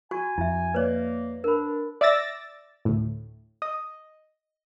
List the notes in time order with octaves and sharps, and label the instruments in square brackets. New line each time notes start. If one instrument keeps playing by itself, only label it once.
[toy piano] F#4 C#6 [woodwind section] G#5
[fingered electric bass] F2 [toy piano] E4 E5
[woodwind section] A#3 [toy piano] B4 C#5 D5
[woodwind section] D4 [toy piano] A#4 B5
[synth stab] D5 E5 D6 E6 A6 A#6
D2 A2
D#5